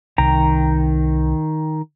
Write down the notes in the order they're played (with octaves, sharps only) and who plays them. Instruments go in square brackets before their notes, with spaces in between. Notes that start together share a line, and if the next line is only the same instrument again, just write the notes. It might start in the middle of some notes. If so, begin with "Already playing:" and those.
[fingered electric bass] C2 [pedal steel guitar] D#3 G5 A#5